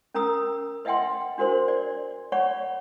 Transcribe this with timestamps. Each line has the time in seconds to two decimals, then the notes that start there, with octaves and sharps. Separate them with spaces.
0.14 C#4 A#4 A#5 D#6 E6
0.85 B4 D#5 E5 F#5 G5 C6
1.38 D4 F#4 A#4 C5 C6
1.68 D5
2.32 C#5 D5 F#5 B5 C#6